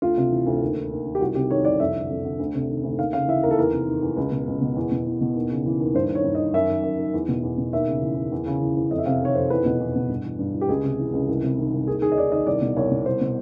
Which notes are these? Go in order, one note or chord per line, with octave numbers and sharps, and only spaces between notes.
D2 F4
C3
E3
D2
D#2
D#3
D#2
D#3
G4
C2 F#4
C3 G4
D#3 C#5
C2 D5
F2 E5
D3
F2
D3
D2
C3
D#3
D2
D#2 F5
C#3 F5
E3 E5
D#2 A#4
A4
E2 A#4
C3
D#3
E2
C#2
B2
C#2
B2
E2
B2
E2
B2
D#2
C#3
E3
D#2
G2 C5
D#3
C#5
G2
D#5
D#3
F#2 E5
D#3
F#2
D#3
E2
B2
E2
B2
D#2 E5
C#3
E3
D#2
E2
C#3
E3
E2
F2 D#5
E5
C3 F5
D#3 C#5
F2 C5
E2 B4
B2
E2
B2
G2
E3
G2
E3
G4
C#2 G#4
C3
E3
C#2
C2
C3
D#3
C2
D#2 G#4
D#3 G#4
D#5
D#2 D5
D#3 D#5
C2 D5
B2
C2 C#5
B2
C2 C5
B2